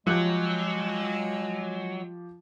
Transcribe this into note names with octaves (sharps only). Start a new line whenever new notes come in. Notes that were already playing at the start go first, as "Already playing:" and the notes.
F3 F#3 G#3 G4 F#6